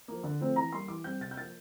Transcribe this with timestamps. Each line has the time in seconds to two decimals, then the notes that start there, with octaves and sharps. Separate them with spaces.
0.08 F3 A#3
0.23 D3
0.41 F3 A3 C4
0.56 E3 A#5
0.72 G3 A#3 C6
0.88 E3 D6
1.04 G3 C4 G6
1.21 C3 A6
1.31 G6
1.37 F3 A#3 A6